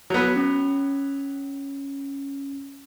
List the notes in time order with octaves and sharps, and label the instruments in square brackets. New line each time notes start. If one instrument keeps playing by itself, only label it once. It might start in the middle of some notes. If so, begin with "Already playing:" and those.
[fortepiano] F#3 B3
[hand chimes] C#4